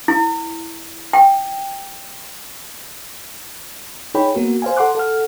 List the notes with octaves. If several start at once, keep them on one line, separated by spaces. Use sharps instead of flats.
E4
G5
D#4 G#4 C#5 G5 B5
A#3 B3 F#4 A#4
C5 F5 G#5
A4 F#5 C6 D6 F#6
A4 F#5 F6